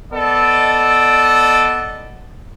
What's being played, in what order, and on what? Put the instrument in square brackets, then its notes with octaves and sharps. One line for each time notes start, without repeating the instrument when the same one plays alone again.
[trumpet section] B3 A4 D5 D#5